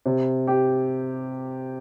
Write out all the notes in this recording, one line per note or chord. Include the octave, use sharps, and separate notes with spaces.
C3
G4